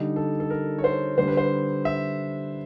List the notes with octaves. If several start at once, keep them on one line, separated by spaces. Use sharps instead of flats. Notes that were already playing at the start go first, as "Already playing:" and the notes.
Already playing: D3 G3 D#4
A4
A4
A#4
C#5
C5
D3 G3 C5
B4
C5
E5